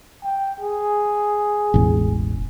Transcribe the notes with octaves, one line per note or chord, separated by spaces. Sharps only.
G5
G#4
E1 A1